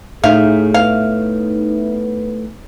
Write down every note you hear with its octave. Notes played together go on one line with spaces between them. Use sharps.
A2 D#4 G#4 E5 F5
B3 F5